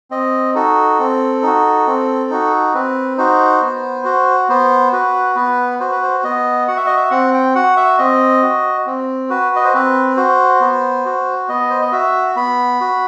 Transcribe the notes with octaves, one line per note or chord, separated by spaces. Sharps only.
C4 D#5
D#4 F#4 A4
C4
D#4 F#4
C4
D#4 F#4
C4 B4
D#4 F#4 C5
B3
F#4
B3 C5
F#4 B4
B3 B4
F#4 C5
B4
C5
B3 D#5
F#4 F#5
E5
D#5
E5
C4 F#5
G5
F#4 F#5
E5
C4 D#5
F#4
C4
F#4 B4
D#5
C5
C4 B4
F#4 C5
B3
F#4
B3 D#5
C5
D#5
F#4 E5
B3 B5
F#4